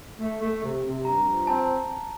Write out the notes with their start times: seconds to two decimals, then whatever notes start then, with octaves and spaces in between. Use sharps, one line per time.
0.19 A3
0.41 A3
0.63 C3
0.84 C3
1.05 G2 A#5
1.26 F3
1.47 C4 A5